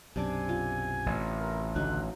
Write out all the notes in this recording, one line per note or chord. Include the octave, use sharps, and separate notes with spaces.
B1 F#2 C3 D4 G#5 D6
F4
A1
A#4
C#2 D3 F#3 A3 D#4 F#6